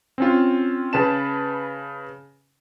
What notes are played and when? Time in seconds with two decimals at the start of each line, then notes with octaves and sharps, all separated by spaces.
0.18 C4 C#4 F4
0.93 C#3 B4 A5 E7